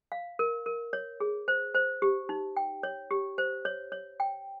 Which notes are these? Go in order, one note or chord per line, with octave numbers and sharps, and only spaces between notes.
F5
A#4
A#4
C#5
G#4
C5
C5
G4
D#4
G5
C#5
G4
C5
C#5
C#5
G5